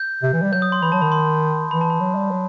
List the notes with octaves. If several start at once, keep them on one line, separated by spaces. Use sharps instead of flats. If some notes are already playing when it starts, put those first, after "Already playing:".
Already playing: G6
C3
E3
G3
F#3 G6
D#6
C6
E3 B5
F#3 A5
D#3 B5
C6
E3 B5
A5
B5
F#3
G3
F#3